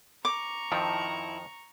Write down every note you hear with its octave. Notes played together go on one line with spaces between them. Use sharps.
A#5 C#6 D6
F2 D#3 F3 E4 A5 E6